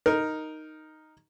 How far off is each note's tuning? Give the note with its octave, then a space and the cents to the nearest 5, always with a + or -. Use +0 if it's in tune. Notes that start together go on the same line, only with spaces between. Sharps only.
D#4 +0 A#4 +0